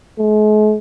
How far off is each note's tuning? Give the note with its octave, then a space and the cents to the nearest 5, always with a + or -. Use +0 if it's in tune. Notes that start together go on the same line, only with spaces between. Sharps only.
G#3 +45